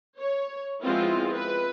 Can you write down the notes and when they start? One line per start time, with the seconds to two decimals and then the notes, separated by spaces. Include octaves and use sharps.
0.19 C#5
0.81 F3 G#3 B3 C4 E4 F4
1.33 B4